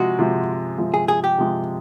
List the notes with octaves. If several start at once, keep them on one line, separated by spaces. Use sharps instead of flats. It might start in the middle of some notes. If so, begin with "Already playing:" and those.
Already playing: C3 F3 G#3 F#4
C3 F3 G#3
C3 F3 G#3
G#4
G#4
G4
C3 F3 G#3